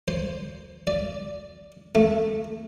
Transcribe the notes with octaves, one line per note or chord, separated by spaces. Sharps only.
C5
D5
A3